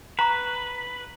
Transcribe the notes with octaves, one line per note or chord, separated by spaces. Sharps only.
B4 A#5 C#6